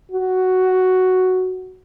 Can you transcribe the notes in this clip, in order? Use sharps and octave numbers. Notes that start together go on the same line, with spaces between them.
F#4